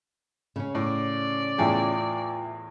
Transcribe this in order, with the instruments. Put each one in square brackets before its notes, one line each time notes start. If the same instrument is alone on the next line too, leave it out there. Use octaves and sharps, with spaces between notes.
[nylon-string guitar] C#3 C#4
[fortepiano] A2 [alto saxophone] D5
[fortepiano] E2 A2 G#4 [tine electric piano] F4 E5 G5